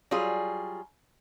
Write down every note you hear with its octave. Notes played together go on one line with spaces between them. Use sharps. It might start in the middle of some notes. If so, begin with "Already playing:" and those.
F#3 G3 F4 G#4